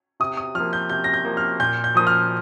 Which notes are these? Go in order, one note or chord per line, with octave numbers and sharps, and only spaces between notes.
C3 D#6
D#6
F3 A#3 F6
G6
C3 G6
A#6
G6
F3 A#3
F6
A#2 G6
G6
F3 A#3 D#6
F6